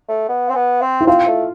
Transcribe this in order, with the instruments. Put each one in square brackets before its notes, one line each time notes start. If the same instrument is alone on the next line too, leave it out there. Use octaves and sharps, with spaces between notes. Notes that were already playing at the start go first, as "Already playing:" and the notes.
[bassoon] A3
B3
C4
B3
C4
[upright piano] E4
[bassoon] C4 [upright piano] F4
[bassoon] A3